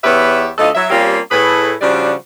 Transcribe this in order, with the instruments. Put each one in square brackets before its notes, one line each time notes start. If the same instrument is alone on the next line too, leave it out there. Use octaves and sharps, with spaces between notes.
[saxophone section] E2 B3 G4 B4 C#5 E5
D2 A3 F4 A4 D#5
F#3 E5
G3 A#3 C4 C#4 F4 G4
A2 G#4 B4
C#3 F3 G3 D4 F#4 D5